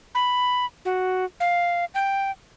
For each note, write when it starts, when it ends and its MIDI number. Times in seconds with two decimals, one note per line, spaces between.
0.15 0.66 83
0.85 1.25 66
1.40 1.85 77
1.95 2.31 79